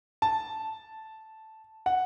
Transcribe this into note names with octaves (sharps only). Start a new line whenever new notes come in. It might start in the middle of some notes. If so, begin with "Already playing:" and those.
A5
F#5